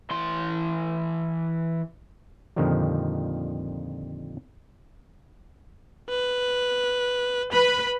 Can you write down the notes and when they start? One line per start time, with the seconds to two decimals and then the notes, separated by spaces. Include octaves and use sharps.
0.11 E3 C6
2.56 F2 A#2 D3 D#3 F3 G3
6.10 B4
7.52 B4 B5